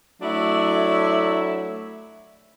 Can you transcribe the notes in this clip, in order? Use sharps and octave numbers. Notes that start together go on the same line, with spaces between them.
F#3 A3 D4 E4 C#5 E5